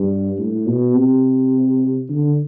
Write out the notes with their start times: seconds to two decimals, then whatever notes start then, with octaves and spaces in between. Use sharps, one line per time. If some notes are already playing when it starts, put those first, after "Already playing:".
Already playing: G2
0.39 A2
0.67 B2
0.95 C3
2.09 D3